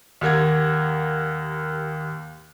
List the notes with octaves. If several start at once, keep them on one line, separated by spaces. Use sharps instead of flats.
D#2 G4 A#4 F#5 G#6